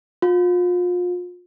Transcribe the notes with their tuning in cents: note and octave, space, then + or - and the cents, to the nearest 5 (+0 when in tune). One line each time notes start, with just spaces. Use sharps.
F4 +35